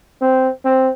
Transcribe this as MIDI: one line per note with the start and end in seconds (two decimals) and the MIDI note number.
0.22 0.49 60
0.65 0.89 60